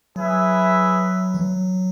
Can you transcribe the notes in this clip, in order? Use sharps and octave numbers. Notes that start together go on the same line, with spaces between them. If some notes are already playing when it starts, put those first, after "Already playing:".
F#3 E4 G#4 B4 E5
E3
F#3